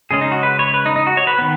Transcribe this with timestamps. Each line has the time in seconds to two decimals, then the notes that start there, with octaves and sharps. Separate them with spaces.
0.11 C#3 G#3 C#4 G#4
0.21 D#4
0.32 F#4
0.43 B4
0.59 C#5
0.74 B4
0.86 D#4
0.96 D#4
1.07 F#4
1.17 C#5
1.27 B4
1.38 D#3 B3